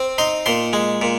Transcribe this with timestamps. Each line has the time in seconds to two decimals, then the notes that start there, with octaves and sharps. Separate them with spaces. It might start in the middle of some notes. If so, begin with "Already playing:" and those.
Already playing: C4
0.18 D#4 C6
0.46 A#2 C6
0.73 G#3
1.01 A#2